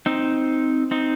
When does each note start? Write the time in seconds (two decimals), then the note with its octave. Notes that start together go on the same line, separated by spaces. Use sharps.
0.06 C4 D#4
0.91 C4 D#4